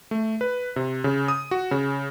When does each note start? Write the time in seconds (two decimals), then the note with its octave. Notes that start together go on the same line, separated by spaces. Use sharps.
0.11 A3
0.41 B4
0.76 C3
1.04 C#3
1.28 D#6
1.51 F#4
1.71 C#3